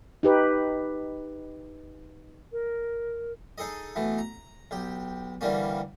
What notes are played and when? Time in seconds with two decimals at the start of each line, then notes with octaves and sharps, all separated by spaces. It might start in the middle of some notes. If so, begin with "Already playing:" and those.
0.23 D#4 G4 B4
2.52 A#4
3.58 D#4 G#4 A4 D#5
3.96 B2 E3 A3
4.18 A#5
4.71 B1 G4
5.41 D3 E3 G3 A#3 C#4